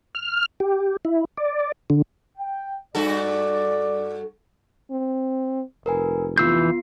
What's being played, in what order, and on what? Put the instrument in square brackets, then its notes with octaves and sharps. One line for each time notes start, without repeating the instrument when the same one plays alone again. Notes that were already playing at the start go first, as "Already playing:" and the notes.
[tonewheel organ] F6
G4
E4
D5
D3
[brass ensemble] G5
[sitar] G2 F#4 A4 [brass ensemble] D5
[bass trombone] C4
[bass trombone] F1 [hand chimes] A#4 B4 G#5
[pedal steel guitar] E3 E6 G6 [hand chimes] B3 F4 C7